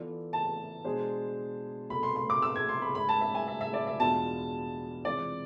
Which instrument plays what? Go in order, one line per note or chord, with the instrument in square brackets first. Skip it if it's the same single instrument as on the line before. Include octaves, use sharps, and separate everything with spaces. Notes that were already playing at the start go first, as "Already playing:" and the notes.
Already playing: [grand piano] E3 B3 F4 A4 D5
[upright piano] A5
[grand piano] B2 G#3 D4 G#4 C5
[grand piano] C2 B2 A3 D4 A4 [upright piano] B5
[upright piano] C6
C6
D6
E6
G#6
C6
B5
[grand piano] G#2 G#3 D4 [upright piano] B5
[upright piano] A5
E5
G#5
E5
E5
D5
E5
[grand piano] E2 B2 G#3 D4 F4 [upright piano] A5
[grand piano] C3 E3 G#3 C4 F4 [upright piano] D5